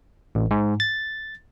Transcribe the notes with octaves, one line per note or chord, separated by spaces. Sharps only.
A1
G#2
A6